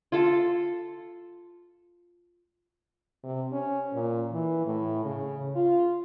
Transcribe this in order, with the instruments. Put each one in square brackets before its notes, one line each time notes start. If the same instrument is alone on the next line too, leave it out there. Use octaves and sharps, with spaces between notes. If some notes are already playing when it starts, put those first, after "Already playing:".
[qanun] F4 A4
[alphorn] C3
C#4
A#2
E3
A2
C#3
F4